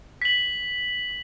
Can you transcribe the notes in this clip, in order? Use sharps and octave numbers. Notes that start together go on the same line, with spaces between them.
B6 F#7